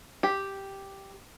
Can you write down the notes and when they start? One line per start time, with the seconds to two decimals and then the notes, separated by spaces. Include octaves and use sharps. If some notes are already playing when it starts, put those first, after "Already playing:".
0.23 G4